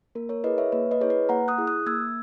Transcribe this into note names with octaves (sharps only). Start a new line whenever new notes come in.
A#3 A#4
A#4 C#5
E4 G#4 B4 D#5
C#5 E5
A#3 B4
B4 D#5
E4 G#4 C#5
B4
A#3 F#5 A#5
D#6 F#6
E4 G#4
D#6 F#6
A#3 E6 G#6